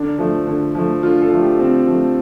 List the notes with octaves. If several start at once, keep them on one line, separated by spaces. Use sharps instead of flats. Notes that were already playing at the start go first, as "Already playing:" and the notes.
Already playing: D3 D4
F3 A3
D3
F3 A3
D3 F4
A4
F3 A3
G4
D3 C4
F3 A3